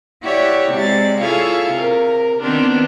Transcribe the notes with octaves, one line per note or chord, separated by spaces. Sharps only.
E4 F#4 G4 C#5 D5 E5
C3 G#3 D5 A6
E4 F4 G#4 A4 C#5 F5
C3 A#4
D#3 B3 C4 D4 F4